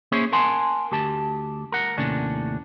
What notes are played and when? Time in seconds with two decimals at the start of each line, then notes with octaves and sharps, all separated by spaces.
0.12 A#3 C#4 E4 G#4 C5 C#5
0.32 A#4 F#5 G#5 A5 C6
0.92 D2 G4 A5
1.72 A#4 F#5
1.98 D#2 A2 C3 C#4 D4